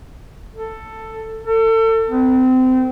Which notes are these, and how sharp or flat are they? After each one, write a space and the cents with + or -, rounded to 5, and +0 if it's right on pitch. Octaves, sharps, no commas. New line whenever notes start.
A4 +10
A4 +35
C4 -30